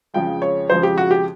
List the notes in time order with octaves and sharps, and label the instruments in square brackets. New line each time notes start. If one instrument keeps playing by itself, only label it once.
[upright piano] F2 C#3 F3 G#3 G5
C#5
F2 C#3 F3 G#3 C5
G4
F#4
G4